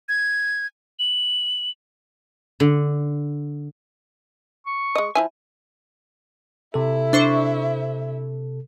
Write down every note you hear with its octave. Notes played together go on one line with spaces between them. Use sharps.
G#6
F#7
D3
C#6
G#3 D#5
F3 E4 G#5
C3 E4 A4 E5
D4 C5 C#6